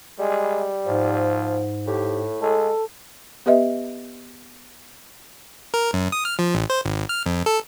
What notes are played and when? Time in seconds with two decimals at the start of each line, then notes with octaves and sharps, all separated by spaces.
0.19 G3 G#3
0.86 G#2 F3
1.87 A2 G4
2.41 G#3 A4
3.46 B3 G4 B4 D#5 E5
5.74 A#4
5.93 F#2
6.12 D#6
6.25 F6
6.39 F3
6.55 A1
6.70 C5
6.85 G#1
7.09 F6
7.26 F2
7.46 A4